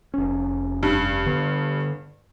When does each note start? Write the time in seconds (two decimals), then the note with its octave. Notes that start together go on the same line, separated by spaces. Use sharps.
0.14 F1 C#4
0.83 G2
1.26 D3 B3